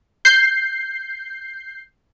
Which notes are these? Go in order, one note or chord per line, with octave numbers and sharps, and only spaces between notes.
G6 C7